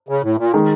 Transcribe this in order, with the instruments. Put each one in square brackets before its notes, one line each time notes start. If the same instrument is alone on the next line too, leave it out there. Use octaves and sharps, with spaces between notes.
[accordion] C#3
A2
A#2
[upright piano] D#3 G#3